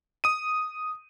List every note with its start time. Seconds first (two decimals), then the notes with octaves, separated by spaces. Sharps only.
0.24 D#6 D#7